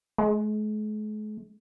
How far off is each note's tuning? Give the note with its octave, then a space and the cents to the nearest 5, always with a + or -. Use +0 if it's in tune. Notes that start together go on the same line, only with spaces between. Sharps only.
G#3 +45